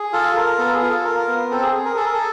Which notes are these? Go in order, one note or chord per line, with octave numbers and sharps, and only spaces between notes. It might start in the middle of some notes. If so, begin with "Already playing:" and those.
Already playing: G#4
F4 A4
F4 A#4
B3 A4
G#4
F4
A4
F4 A#4
B3
C4 A4
G#4
G#4
A#4
G#4 A4
A#4
A4